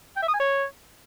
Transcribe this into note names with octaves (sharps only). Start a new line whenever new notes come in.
G5
E5
D#6
G#5
C#5